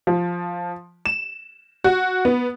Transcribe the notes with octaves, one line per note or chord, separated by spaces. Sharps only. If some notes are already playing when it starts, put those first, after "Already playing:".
F3
E7
F#4
B3